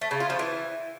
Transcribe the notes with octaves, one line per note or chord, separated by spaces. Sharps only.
A3
C#3
F4
F3
E3